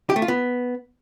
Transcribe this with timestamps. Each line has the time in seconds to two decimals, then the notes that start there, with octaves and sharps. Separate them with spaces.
0.10 G4
0.16 A3
0.22 F4
0.28 B3